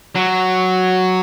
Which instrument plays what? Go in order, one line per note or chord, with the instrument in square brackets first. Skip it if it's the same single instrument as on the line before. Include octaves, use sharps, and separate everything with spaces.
[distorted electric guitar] F#3